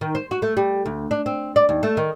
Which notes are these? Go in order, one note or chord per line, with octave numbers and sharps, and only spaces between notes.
D#3
C5
F#4
A3
G3
D2
D4
C4
D5
D#2
A3
D#3